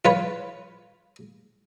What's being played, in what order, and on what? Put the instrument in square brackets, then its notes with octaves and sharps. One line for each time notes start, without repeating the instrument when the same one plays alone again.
[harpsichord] F4 B4 C#5